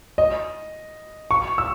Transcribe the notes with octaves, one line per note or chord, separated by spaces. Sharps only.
D#5
C#6
E6